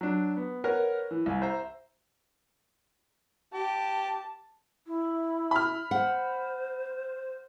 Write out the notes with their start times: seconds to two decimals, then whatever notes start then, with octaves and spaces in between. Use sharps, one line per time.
0.01 F#3 D4
0.37 B3
0.64 A#4 B4 C#5 F#5
1.11 E3
1.26 C2 G#5
1.42 C5 E5 A#5
3.54 G4 A5
4.87 E4
5.51 B5 F6
5.91 C5 F#5